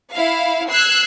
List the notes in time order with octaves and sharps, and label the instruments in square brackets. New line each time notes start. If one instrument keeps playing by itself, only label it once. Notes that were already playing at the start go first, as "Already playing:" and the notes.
[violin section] E4 F5
E6 F#6 G#6 C7